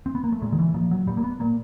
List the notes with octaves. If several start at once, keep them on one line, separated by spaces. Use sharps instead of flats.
C4
B3
A#3
A3
A#2 G#3
D#3
E3
A#2 F3
F#3
A#2 G3
A#3
B3
A#2 A#3